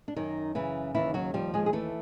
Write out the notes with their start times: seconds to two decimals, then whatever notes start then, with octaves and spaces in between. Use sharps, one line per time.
0.08 D4
0.16 F#2 D#3 D#4
0.55 C#3 E3 E4
0.95 D#2 E3 E4
1.14 F#3 F#4
1.34 F3 G3 G4
1.54 G#3 G#4
1.66 G#4
1.73 E3 A3 A4